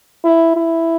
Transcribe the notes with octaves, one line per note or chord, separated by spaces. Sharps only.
E4
E4